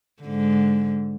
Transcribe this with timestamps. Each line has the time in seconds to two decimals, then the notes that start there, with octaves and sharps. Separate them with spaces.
0.23 G#2 D3